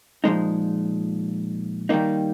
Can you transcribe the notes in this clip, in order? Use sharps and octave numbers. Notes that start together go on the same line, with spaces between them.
A#2 F3 G#3 D#4
D#3 G3 A#3 D#4